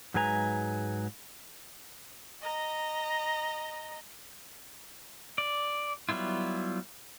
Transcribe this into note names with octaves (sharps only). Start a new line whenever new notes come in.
G#2 F#3 G#3 B4 G#5 A#5
D#5 A#5
D5
F#3 G3 B3 E4 F4